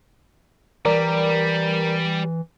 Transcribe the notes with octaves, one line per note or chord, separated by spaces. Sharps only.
E3 G3 A#4 D5 A#5